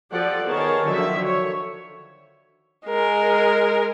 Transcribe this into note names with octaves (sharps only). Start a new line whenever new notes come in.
F3 G4 A4 D5 F#5
D#3 B3 G#4 A#4 C#5 A5
D3 D#3 F3 F#3 E5
C#5
G#3 A#4